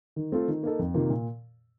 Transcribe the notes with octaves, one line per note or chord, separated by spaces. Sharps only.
D#3
A3 C4 F4 A4
D#3
A#3 D#4 A4
F2
C3 D#3 A#3 F4
A#2